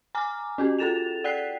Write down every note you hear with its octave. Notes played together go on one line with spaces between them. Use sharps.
G#5 A#5 D6 F6
C#4 F#4 G4
F4 G#4 A4 A6 E7 F7
D5 F#5 G5 F#6 B6 C7